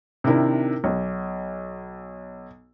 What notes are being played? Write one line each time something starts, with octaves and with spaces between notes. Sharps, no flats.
C3 D#3 D4 E4 A#4
B1